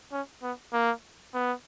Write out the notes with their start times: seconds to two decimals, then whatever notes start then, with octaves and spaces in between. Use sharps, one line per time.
0.12 C#4
0.43 B3
0.73 A#3
1.34 B3